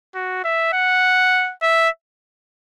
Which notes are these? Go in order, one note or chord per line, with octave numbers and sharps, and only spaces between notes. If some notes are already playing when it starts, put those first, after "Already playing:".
F#4
E5
F#5
E5